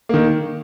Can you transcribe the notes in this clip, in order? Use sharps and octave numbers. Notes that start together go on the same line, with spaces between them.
D#3 A#3